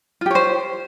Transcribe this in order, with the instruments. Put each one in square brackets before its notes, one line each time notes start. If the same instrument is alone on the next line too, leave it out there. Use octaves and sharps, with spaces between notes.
[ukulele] F4
G4
C#5
C5